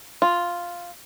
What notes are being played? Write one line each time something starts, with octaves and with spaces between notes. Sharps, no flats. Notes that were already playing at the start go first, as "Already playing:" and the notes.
F4